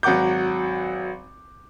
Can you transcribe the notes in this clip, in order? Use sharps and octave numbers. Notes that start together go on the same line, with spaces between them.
G#1 F#3 F#5 D6 G6